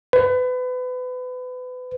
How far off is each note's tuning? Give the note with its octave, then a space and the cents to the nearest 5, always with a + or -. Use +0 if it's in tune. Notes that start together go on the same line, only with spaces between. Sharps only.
B4 +30